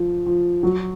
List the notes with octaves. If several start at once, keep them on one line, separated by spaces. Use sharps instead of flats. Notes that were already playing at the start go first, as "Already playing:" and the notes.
Already playing: F3
F3
F#3